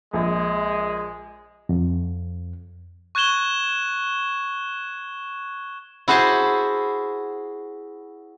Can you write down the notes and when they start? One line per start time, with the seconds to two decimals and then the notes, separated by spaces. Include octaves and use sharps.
0.14 A#1 G#3
1.69 F2
3.15 C#6 F#6 G#6 E7 G7
6.08 E4 F#4 G#4 C5 A5